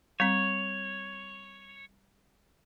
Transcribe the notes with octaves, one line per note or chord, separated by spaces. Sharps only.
G3 C4 C#5